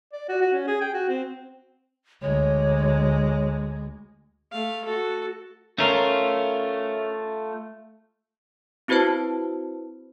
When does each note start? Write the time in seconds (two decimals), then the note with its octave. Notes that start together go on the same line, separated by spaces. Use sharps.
0.13 D5
0.29 F#4
0.41 F#4
0.53 C#4
0.67 G#4
0.81 G5
0.94 F#4
1.09 C4
2.22 D2 G#3 C#5
4.52 A3 F5
4.85 F#4 A4
5.78 A3 C#4 F4 A#4
8.88 C4 E4 F#4 B4 C5 A5